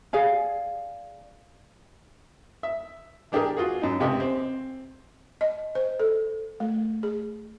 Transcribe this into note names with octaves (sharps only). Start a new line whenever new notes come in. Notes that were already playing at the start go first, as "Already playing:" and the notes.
G#4 D5 F5 G#5
E5
E3 D4 G4 G#4 A#4
F4 F#4 G#4
F#2 D#4
C#2 C3 G4 D#5
C4
D#5
C5
A4
A3
G#4